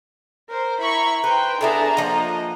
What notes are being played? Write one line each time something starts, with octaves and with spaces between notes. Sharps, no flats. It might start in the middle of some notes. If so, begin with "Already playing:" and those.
A#4 C5
E4 A#5 B5 C#6
B4 C5 G5
B3 D4 E4 G#4 A4 A5 A#5
F3 A#3 D#5 F#5